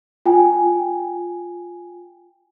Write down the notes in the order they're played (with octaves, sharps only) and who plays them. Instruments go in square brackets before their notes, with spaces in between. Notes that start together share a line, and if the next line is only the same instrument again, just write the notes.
[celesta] F4 G5 G#5